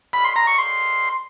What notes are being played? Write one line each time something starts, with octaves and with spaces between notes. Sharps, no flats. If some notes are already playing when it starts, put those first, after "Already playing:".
B5
C6
A#5
C#6
C6